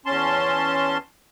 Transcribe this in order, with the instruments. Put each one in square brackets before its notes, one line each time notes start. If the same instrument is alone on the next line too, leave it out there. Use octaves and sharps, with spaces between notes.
[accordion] E2 C#4 A5 C6